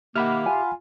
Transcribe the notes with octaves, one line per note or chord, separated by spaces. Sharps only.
D#3 A#3 G4 E5 F#5 B5 F6
F4 G#5